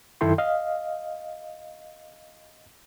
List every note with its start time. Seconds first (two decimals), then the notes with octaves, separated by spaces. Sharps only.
0.21 F#2 D#3 E4 A4 G5 C6
0.38 D#5 F5